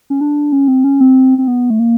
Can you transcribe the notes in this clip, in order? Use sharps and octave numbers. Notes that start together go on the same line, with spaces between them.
C#4
D4
C#4
C4
C#4
C4
C4
B3
A3
A#3